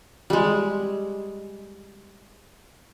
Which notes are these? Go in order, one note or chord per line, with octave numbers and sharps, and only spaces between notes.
G3 G#3